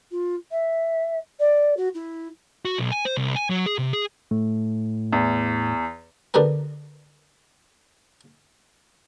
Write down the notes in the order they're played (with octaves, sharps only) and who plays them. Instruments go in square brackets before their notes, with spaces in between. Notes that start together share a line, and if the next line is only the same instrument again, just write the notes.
[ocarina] F4
E5
D5
F#4
E4
[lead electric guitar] F#4
B1
G#5
C5
C2
G#5
F#3
G#4
C3
G#4
[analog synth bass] A2 [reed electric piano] A3
[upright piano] E2
[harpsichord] D3 B3 F#4 G4 A#4